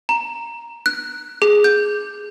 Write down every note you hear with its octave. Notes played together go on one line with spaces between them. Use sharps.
A#5
F#6
G#4
G6